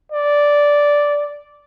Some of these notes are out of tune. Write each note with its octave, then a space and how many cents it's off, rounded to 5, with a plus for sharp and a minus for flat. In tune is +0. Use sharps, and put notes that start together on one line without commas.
D5 -5